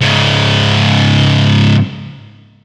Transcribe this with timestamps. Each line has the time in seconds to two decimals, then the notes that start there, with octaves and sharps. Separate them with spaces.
0.01 G#2 C#3